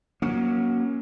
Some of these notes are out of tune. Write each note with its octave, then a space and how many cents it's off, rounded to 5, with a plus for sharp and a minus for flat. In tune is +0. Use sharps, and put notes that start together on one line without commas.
F#3 +0 A#3 +25 C#4 +0